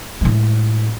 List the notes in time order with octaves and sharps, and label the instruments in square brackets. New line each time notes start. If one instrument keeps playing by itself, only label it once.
[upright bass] A2 G#3